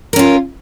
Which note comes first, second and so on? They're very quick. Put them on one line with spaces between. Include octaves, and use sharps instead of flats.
A#4 C#4 F4